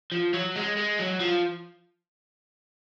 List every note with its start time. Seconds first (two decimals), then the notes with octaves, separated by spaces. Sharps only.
0.12 F3
0.34 F#3
0.56 G#3
0.77 G#3
0.99 F#3
1.20 F3